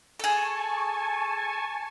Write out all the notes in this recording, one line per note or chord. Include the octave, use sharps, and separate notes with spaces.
G#4 A4 G#5 A5 C#6